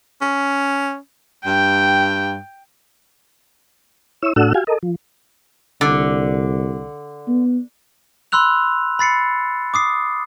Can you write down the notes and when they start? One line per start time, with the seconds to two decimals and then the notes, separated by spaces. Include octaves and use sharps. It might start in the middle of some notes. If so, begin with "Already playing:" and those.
0.21 C#4
1.46 G2 G5
4.22 E4 C#5 E6
4.36 A2 D4 F#4 A4 F#5 E6
4.54 F#4 G4 F5 G#5
4.67 A4 A#4 D#5
4.83 F3
5.81 C2 D3
7.28 B3
8.32 B5 C6 E6 F#6 F7
8.99 B5 A6 C7 C#7
9.74 D6 D#6 C7